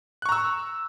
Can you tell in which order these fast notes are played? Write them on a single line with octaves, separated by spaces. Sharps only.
F#6 C#6 A#5 E6